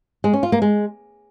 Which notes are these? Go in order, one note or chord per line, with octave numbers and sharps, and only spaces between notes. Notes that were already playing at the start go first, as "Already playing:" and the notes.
G#3
C#4
F4
A#3
G#3